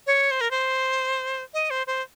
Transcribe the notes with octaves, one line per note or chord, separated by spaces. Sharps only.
C#5
C5
A#4
C5
D#5
C5
C5